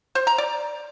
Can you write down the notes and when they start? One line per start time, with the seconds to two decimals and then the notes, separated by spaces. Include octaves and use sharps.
0.15 C5
0.27 A#5
0.38 D5